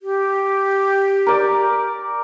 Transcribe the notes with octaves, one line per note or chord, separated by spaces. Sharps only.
G4
A#4 D5